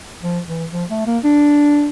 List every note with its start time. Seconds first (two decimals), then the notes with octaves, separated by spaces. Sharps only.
0.22 F3
0.48 E3
0.73 F3
0.90 A3
1.07 A#3
1.24 D4